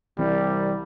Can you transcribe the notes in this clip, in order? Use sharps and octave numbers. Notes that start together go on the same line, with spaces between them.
C2 E3 G3 C4